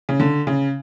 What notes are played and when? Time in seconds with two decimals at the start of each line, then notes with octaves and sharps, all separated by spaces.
0.09 C#3
0.20 D3
0.47 C#3